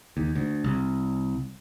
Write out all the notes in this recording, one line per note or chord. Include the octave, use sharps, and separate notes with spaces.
D#2
D2
C2